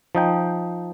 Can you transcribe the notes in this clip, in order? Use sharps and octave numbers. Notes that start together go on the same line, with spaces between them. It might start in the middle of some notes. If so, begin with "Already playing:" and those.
F3 D#4 G5